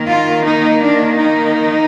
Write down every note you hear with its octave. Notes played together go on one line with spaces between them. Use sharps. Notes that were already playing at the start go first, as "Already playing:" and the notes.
Already playing: D#3 A#3
F4
D#4
D4
D#4